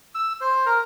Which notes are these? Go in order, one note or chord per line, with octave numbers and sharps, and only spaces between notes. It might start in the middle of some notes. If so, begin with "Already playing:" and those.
E6
C5
A#4